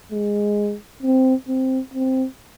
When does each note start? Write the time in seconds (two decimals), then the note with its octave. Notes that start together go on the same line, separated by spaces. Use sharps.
0.12 G#3
1.02 C4
1.48 C4
1.94 C4